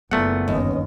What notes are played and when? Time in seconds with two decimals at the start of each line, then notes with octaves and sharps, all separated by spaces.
0.11 F#1 A#2 A3 B3 F#5
0.48 G1 D#2 B3 C#4 D#5